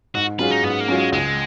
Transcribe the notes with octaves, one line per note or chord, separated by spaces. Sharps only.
G#2 F#4
F#3 C#4 F4 G#4 B4
D#4
G#2 B3
A#3
F#3 C#4 F4 G#4
G#3
C#2 G#3